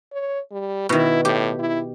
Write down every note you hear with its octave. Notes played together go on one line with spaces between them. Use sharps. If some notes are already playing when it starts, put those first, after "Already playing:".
C#5
G3
B2 D#3 E4
A2 G4
E4